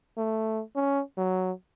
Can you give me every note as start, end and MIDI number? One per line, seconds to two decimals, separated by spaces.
0.18 0.62 57
0.76 1.02 61
1.18 1.52 54